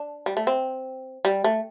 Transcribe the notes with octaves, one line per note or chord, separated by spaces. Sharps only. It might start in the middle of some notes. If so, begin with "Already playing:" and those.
Already playing: D4
G3
A3
C4
G3
A3